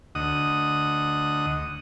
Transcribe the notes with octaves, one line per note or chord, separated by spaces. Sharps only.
D2 D#5 F#5 D#6